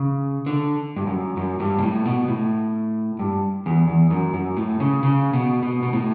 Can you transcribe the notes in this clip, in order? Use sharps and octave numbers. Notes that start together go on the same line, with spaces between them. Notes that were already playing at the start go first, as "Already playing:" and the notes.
Already playing: C#3
D3
G2
F#2
F#2
G2
B2
A2
B2
A2
G2
E2
E2
F#2
F#2
A2
C#3
C#3
B2
B2
B2
A2